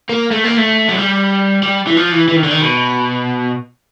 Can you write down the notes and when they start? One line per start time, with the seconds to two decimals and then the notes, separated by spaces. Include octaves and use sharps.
0.09 A#3
0.31 A3
0.45 A#3
0.58 A3
0.89 F#3
0.97 G3
1.63 G3
1.87 E3
1.97 F3
2.12 E3
2.28 E3
2.36 D#3
2.44 D3
2.51 D#3
2.62 B2